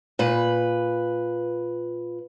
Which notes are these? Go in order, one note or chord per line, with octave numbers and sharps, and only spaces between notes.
A#2 B4